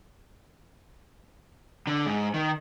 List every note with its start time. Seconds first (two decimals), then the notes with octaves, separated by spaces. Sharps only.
1.87 D3
2.06 G#2
2.34 D#3